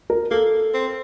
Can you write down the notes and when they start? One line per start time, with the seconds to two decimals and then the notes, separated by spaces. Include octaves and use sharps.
0.10 A#4
0.31 A#3 A4
0.74 C4